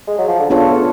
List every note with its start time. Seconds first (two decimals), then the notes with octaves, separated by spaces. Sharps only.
0.08 G#3
0.18 F#3
0.28 F3
0.39 D3
0.50 C#3 B3 D4 F4 A4 C#5
0.68 A2